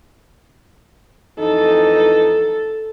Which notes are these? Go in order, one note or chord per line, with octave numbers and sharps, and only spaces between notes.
F2 E3 D#4 A4